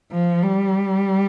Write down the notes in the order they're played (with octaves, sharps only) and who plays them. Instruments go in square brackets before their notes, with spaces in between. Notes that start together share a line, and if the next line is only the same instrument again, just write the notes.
[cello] F3
G3